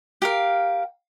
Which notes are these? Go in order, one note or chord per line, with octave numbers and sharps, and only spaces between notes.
G4 A#4 F5